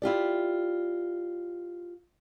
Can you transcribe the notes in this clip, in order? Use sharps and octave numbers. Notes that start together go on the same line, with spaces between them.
E4 F4 G4 D5